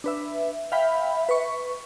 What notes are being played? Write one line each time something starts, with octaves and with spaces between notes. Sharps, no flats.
D4 B4 E5
E5 F5 G5 B5
B4 C#6